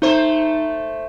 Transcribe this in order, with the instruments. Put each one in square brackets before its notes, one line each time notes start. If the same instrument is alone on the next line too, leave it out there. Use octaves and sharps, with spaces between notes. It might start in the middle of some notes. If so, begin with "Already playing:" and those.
[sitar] A3 C5 [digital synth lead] D#4